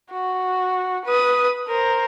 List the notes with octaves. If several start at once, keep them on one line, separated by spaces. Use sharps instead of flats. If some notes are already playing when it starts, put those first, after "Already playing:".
F#4
B4 D#6
A#4 C5